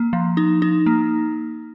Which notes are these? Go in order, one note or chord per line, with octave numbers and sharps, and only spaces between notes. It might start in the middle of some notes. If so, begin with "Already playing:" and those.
Already playing: A#3
F3
D#4
D#4
A#3